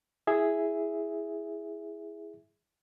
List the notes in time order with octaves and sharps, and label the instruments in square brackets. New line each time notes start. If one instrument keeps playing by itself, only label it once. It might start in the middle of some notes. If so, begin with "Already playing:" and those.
[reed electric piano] E4 G#4 E5